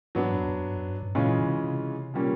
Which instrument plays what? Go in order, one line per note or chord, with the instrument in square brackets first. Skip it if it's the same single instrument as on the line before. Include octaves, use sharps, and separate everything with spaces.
[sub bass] G#2 [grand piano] F#3 B3 D4
[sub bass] F#2
E2
F2
G2
F#2
G2
G#2
[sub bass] A#2 [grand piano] C#3 E3 G#3 C#4 F4
[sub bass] C3
C3
[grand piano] A#2 G3 A#3 C#4